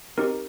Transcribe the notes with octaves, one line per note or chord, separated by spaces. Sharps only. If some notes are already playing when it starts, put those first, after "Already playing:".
C4 D#4 G4 A#4